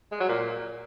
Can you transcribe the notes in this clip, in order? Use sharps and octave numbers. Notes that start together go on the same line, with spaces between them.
G#3
F#3
A#2